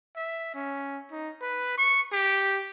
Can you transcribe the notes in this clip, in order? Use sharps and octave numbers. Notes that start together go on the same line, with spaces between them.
E5
C#4
D#4
B4
C#6
G4